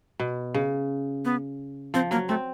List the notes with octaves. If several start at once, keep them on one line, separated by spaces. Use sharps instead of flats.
B2
C#3
B3
F3 C4
F#3 A#3
A3 C4